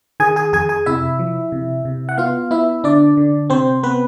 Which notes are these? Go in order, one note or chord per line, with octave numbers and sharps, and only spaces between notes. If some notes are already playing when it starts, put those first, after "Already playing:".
D#3 G#4 G#5
G#4 G#5
F2 G#4 G#5
G#4 G#5
C3 E4 E5
F3
C3
C3
F#5
B3 F4 F5
B3 E4 E5
D3 D4 D5
D3
C3 C4 C5
B3 C4 B4